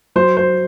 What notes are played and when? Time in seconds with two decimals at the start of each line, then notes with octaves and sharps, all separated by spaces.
0.16 F#3 C5
0.37 C5